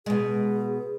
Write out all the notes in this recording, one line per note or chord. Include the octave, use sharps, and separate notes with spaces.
B2 G#3 G#4